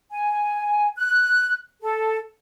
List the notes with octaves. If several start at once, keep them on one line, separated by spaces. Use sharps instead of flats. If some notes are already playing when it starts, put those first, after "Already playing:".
G#5
F#6
A4